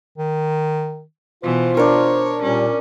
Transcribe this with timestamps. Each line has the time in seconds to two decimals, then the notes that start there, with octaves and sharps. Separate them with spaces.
0.18 D#3
1.44 B2 E3 F4 C5
1.77 D4 A#4 C#5
2.43 A#2 G3 C#4